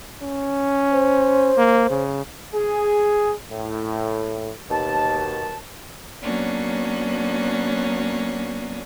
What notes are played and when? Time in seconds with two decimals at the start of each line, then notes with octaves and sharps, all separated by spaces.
0.22 C#4
0.92 C5
1.58 A#3
1.90 C#3
2.54 G#4
3.51 A2
4.70 D#2 B2 A5
6.21 F#3 A#3 B3 C#4 D4